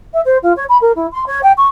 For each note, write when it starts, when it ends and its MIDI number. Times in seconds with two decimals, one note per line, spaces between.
0.13 0.20 76
0.25 0.37 72
0.42 0.52 65
0.56 0.64 73
0.68 0.77 83
0.81 0.92 70
0.95 1.06 64
1.12 1.25 84
1.26 1.40 73
1.42 1.52 79
1.57 1.67 85